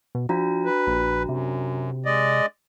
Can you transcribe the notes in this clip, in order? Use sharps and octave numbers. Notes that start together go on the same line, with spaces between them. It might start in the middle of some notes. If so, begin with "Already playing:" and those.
B2
F3 D4 F#4 A#5
B4
A#1
F#2 C3
G#3 D5 D#5